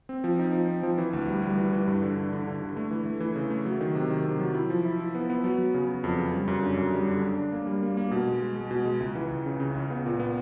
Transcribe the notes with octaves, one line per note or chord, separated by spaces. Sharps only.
C4
F3
D#4
F3
C4
F3
E3
D2
G3
G3
E3
E3
G2
D3
D3
D3
D3
D3
A3
E3
A3
E3
C#3
A3
F#3
D#3
C3
D#3
C3
F#3
E4
F3
E4
E4
B3
B3
F#3
F#3
C#3
F#3
F2
C#3
G3
F#2
D3
F#2
G3
D3
D4
D4
A#3
G3
A#3
A#3
B2
G#3
G#3
G#3
B2
G#3
C#2
E3
C#2
C#3
C#3
C#2
B3
A#2
B3